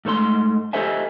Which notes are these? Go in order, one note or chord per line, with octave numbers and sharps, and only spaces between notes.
G#2 A3 C5 C6
G4 A4 C5 D#5 E5 G#5